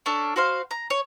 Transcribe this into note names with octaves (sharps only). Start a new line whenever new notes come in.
C#4 D4 A4
F#4 C5 F5
A#5
C#5